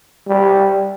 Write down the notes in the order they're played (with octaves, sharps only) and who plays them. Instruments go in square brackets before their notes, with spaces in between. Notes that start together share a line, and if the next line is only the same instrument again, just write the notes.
[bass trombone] G3